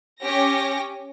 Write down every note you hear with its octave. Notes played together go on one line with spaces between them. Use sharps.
C#4 G4 A#6